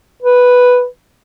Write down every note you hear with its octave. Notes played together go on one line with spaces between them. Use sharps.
B4